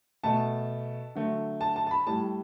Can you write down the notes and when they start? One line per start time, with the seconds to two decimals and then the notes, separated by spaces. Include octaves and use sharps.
0.24 B2 A3 A5
1.15 D3 F#3 A3
1.61 A5
1.76 A5
1.87 A5
1.91 B5
2.06 A2 G3 A5